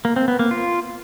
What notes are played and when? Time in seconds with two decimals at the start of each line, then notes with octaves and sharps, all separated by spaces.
0.05 A#3
0.16 C4
0.28 B3
0.39 A#3
0.51 F4